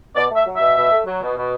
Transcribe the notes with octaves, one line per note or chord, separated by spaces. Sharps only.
B2 D5
A3
E5
F#3
E5
B2
B2
A3
F#3
B2
B2